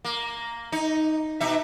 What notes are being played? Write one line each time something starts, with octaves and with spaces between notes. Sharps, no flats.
A#3
D#4
B2 D#4 E5